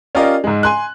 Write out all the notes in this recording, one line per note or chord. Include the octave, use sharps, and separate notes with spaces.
C#4 F4 G4 A#4 D5 D#5
G#2 G#3
G#5 C6 F#6